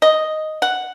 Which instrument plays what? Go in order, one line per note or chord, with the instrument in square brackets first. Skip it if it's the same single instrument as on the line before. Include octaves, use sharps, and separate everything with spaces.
[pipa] D#5
F#5